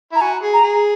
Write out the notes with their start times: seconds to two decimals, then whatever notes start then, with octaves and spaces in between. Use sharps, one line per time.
0.12 E4 A#5
0.21 F#4 G#5
0.42 G#4
0.53 A#5
0.63 G#4